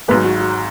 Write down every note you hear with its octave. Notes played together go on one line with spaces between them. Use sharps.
G#1 G#2 F#3 B3 B4
F#4
F#4